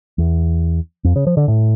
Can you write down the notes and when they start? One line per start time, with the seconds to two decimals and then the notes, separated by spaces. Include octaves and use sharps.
0.18 E2
1.04 F2
1.16 C#3
1.27 F3
1.37 D3
1.48 A2